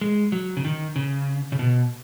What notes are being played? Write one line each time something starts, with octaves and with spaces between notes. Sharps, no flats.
G#3
F#3
C#3
D#3
C#3
C#3
B2